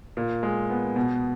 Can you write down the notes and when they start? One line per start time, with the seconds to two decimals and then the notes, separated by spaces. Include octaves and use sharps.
0.17 A#2
0.43 G#3
0.70 B3
0.96 B2